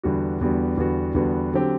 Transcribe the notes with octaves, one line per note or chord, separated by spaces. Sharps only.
E2 D3 G3 B3 F#4
E2 D3 G3 B3 F#4
E2 D3 G3 B3 F#4
E2 D3 G3 B3 F#4
D3 F#3 C4 G4